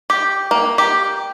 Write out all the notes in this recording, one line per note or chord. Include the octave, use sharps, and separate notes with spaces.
G4
A#3
G4